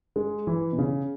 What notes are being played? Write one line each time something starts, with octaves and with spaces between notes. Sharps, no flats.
G#3
E3
B2
C#3